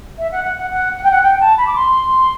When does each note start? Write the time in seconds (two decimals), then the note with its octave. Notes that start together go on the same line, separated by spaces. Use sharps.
0.18 E5
0.32 F#5
0.44 F#5
0.58 F#5
0.71 F#5
0.97 F#5
1.03 G5
1.11 F#5
1.22 G5
1.41 A5
1.57 B5
1.67 D6
1.76 C6